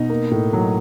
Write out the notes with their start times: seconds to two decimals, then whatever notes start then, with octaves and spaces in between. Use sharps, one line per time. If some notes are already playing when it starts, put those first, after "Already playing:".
Already playing: B2 D#4
0.10 A#3
0.31 A2
0.53 F#3